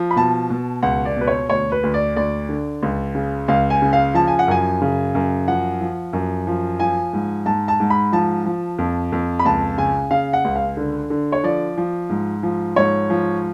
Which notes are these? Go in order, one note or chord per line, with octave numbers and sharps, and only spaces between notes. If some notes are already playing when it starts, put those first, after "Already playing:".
Already playing: F3
B5
B2 A5
B2
C#2 F#5
D5
B2 B4
C#5
D2 C#5
B4
D2
D5
D2 D5
D3
C#2
C#3
C#2 F5
G#5
C#3
F5
F3 A5
G#5
F#5
F#2 G#5
C#3
F#2
F3 F#5
F3
F#2
F3
F3 G#5
G#2
G#2 A5
A5
G#2
B5
F3 A5
F3
F2
F2
B5
C#2 A5
C#3 G#5
C#3 F5
F#5
C#2
F5
D3
D3
C#5
F3 D5
F3
G#2
F3
G#2 C#5
F3